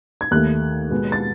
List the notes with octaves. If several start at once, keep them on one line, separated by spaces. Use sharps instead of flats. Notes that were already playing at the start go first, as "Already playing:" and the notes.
G#6
D#2 D#3 A3 F#6
B2 G#3 B3
A6